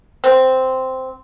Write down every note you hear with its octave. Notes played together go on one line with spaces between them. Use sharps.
C4